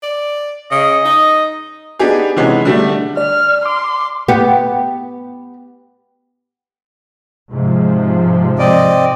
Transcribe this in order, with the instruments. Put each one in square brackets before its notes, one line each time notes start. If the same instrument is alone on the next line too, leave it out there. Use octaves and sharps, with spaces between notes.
[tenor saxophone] D5
[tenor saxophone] C#3 [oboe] D#5
[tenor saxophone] D#4
[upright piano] B3 D4 D#4 G4 G#4
C3 D#3 E3 G#3 B3 C#4
D3 G3 A3
[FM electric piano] D5 [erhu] F6
[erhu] C6 [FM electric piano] D6
[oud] B3 G4
[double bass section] G#2 C3 F3
[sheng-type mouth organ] C4 D5 D#5